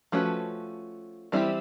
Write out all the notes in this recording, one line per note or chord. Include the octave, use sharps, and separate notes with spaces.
F3 A3 C#4 F#4 B4
E3 G3 C4 E4 G4